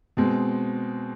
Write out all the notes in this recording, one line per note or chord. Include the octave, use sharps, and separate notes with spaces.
B2 G#3 C4